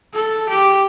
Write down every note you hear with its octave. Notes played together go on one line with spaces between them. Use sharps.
A4
G4